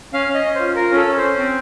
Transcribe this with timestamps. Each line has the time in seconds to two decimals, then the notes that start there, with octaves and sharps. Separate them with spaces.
0.14 C#4 F5
0.29 C#4
0.35 D#5
0.45 C#4
0.55 F4 C5
0.76 F4 A#4
0.92 C#4 A4
1.07 C#4
1.18 C5
1.23 C#4
1.39 C4